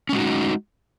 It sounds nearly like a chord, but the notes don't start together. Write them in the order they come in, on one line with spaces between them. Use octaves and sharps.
C#4 G#3 F#4 D#4